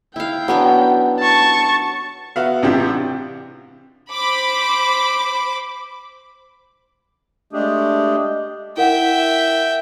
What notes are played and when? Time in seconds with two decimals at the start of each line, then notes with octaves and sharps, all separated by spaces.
0.16 E4 F5 G5
0.48 F#3 B3 C#4 D4
1.19 A5 C#6
2.36 B3 F#4 E5 F5
2.62 A1 C3 D4 E4 F4 G4
4.12 C5 B5 D6
7.53 G#3 A3 D4 G4 G#4
8.77 E4 A#4 E5 F#5 G5